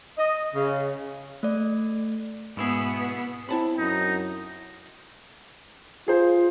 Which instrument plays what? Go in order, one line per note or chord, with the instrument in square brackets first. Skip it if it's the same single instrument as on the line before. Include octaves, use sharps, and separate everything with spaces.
[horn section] D#5
C#3
[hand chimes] A3 D5
[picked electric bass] G#2 [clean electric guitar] B2 E4 G#4 [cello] B3
[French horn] C4 [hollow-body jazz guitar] E4 A5 B5
[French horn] F#2 [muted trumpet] D#4
[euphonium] F4 [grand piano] G#4 C5